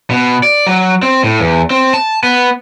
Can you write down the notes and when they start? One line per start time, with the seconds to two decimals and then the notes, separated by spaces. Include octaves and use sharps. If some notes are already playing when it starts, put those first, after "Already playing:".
0.11 B2
0.43 D5
0.67 F#3
1.03 C4
1.24 A2
1.40 E2
1.71 C4
1.94 A5
2.23 B3